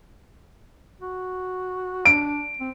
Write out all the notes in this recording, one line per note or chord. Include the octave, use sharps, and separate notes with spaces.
F#4
D4 D7
C4